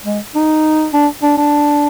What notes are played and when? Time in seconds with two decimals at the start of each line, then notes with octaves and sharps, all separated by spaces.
0.05 G#3
0.35 D#4
0.93 D4
1.23 D4
1.37 D4